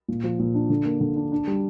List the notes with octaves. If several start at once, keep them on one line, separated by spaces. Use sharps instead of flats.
A#2
F3
A#2
D4
D3
A#3
D3
D4
D4
G3